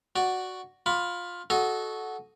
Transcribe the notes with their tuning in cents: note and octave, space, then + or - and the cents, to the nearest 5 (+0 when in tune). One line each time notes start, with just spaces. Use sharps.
F#4 +0 D5 +0
F4 +10 B5 +0 D6 -40
F#4 +0 A4 -20 D#5 +0